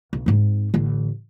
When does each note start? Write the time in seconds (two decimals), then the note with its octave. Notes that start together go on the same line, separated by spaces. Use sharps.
0.13 B1
0.26 G#2 C4
0.74 A1 D3